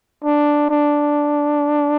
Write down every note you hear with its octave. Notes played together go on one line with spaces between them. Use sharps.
D4
D4